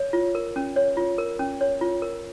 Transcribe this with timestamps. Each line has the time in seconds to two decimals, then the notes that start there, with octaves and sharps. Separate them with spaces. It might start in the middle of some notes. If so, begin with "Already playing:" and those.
Already playing: C#5
0.13 F4
0.35 A#4
0.56 C#4
0.76 C#5
0.97 F4
1.18 A#4
1.39 C#4
1.61 C#5
1.81 F4
2.02 A#4